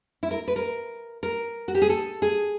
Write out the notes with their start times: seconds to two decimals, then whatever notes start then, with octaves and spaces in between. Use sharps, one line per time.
0.23 E4
0.31 A#4
0.48 B4
0.56 A#4
1.23 A#4
1.68 F#4
1.75 G4
1.82 G#4
1.89 A4
2.22 G#4